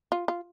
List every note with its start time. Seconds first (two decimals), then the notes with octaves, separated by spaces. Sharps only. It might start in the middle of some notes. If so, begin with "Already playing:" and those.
0.12 F4
0.28 F4